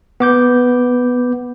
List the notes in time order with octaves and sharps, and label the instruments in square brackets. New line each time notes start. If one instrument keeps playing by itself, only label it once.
[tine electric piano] B3 D6 G6